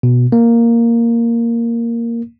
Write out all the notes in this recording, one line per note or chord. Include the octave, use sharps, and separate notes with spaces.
B2
A#3